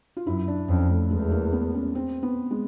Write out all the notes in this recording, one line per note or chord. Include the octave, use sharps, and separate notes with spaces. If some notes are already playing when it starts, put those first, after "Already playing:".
F4
F#2 E4
D4
F2 C#4
A3
E2 G#3
A#3
B3
C#4
C4
B3
G#3